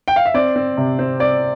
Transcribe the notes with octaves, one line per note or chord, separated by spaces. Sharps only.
G5
F5
E5
C4 D5
C4
C3
C4
C4 D5